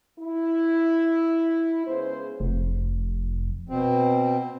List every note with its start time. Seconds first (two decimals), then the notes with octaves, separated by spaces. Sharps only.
0.20 E4
1.87 C#3 G#3 B3 C5
2.40 F1
3.69 B2 C4